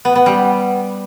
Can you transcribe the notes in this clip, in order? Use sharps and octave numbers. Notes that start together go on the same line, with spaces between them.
B3
B3
G3